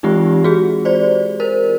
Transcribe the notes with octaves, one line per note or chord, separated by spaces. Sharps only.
E3 G#3 C4 D#4 F4 G4
F#4 G#4
C5 D5
A#4 C5